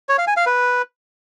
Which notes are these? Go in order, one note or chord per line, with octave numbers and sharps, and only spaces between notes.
C#5
F5
G#5
F5
B4